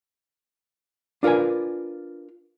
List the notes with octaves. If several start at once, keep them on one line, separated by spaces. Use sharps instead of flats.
D4 F4 A#4 B4 G#5